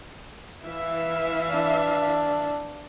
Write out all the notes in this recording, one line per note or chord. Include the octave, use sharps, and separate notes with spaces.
E3 E5 F5
D4